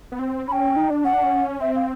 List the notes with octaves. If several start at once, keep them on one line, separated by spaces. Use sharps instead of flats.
B3
C4
C#4 G5 B5
D#4
D4
C#4 F#5
D4
C#4
C4 E5
F5